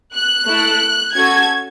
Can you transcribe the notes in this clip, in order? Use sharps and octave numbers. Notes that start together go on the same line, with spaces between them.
F#6
A3 E4 A4
C#4 F#4 A4 G#6